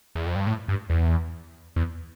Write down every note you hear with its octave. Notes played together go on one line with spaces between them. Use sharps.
E2
F2
G2
A2
G2
E2
E2